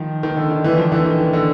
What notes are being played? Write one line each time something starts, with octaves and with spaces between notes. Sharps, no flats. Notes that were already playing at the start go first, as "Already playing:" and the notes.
Already playing: D#3 F3
D#3
D3
D#3
D3 E3
D#3 F3
D3 E3
D#3
D#3
D3